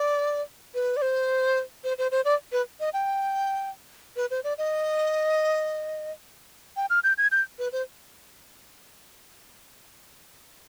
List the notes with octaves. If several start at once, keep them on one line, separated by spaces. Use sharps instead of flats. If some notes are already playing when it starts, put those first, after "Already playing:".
Already playing: D5
B4
D5
C5
C5
C5
C5
D5
B4
D#5
G5
B4
C5
D5
D#5
G5
F6
G6
G#6
G6
B4
C5